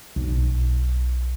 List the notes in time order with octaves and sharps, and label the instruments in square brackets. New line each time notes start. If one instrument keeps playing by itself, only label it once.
[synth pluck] B1